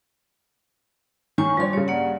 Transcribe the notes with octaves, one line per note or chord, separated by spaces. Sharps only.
D#3 C#5 G#5 C#6
F3 G3 D4 C#5 C6
G2 C#3 C#5
A#3 D5 F#5